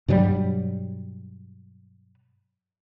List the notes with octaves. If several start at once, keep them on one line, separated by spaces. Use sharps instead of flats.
G2 B2 F#3 G3